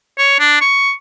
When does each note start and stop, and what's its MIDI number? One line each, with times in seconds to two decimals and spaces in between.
0.18 0.39 73
0.39 0.59 62
0.61 0.91 85